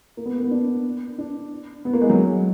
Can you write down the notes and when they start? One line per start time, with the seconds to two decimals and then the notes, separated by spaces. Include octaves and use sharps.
0.17 A#3
0.26 B3
0.34 A#3
0.43 B3
0.51 D4
1.18 D4
1.85 B3
1.93 A#3
2.01 G#3
2.10 F#3